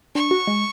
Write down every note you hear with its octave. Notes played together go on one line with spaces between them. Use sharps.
D4 C#6
F#4
G#3